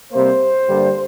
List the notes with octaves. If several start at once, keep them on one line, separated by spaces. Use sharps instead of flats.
C3 G3 A#3 C5
G2 D3 G3 A#3